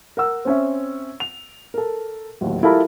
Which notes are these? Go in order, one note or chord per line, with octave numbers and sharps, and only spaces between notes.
A#4 F#5 E6
C4 C#4 E5
F7
A4 A#4
D1 D#2
E4 F4 G4 A4 A#4 B5